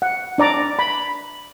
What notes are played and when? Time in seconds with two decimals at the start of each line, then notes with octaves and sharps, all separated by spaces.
0.02 F#5
0.38 D4 D5 A#5 D6
0.79 B5